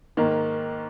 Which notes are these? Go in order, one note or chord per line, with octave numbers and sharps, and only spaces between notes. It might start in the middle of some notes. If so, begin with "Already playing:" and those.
G#2 D#3 A#3